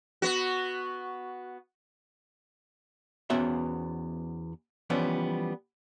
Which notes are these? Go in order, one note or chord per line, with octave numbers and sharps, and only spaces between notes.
B3 F#4
E2 B3 C#4 F#4 C5 E5
E3 F3 G3 B3 C#4